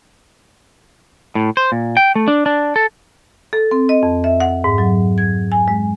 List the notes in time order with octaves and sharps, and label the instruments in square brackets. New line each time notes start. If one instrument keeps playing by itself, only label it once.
[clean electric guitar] A2
C5
A#2
G5
A3
D4
D4
A4
[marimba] A4
C4
D#5
F2
E5
F#5
G#2
F#3
G#6
G#5
G#3